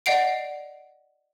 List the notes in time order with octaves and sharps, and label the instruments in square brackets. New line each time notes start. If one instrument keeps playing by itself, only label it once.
[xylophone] D5 D#5 F#5 C7 D7